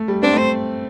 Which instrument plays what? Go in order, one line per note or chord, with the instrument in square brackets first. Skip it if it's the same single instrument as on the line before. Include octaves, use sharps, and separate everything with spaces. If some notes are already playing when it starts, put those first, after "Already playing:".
Already playing: [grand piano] A3
G3
[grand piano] C4 [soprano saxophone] D4
[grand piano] A3 [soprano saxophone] C5